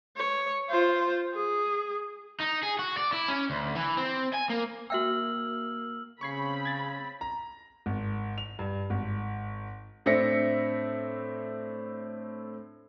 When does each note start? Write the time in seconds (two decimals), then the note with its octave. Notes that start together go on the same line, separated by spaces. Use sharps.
0.17 C#5
0.69 F4 C5
1.35 G#4
2.40 D#4
2.63 G#4
2.79 F#4
2.97 D5
3.13 E4
3.28 C#4
3.50 D2
3.76 E3
3.97 C4
4.33 G#5
4.49 A#3
4.90 A#3 F#4 E5 G5 E6 F6 F#7
6.21 C#3 C4 B5 C#6 G#6 C7
6.65 G#6 A6
7.21 A#5
7.86 G#1
8.38 F7
8.59 G2
8.90 G#1
10.06 A2 C4 D4 E5 A#6 C#7